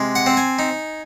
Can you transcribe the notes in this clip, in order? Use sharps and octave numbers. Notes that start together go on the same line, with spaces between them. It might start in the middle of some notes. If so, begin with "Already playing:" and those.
Already playing: C3 G#3
F#5
C4
G#5
D#4